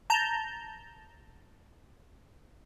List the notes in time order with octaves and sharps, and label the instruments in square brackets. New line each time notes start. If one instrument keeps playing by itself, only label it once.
[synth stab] A5 A#5 G6